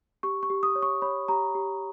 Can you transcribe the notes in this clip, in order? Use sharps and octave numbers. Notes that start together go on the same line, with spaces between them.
G4 C#6
C#6
G4
D#6
C#5
C#6
C#5 B5
G4 A#5
G4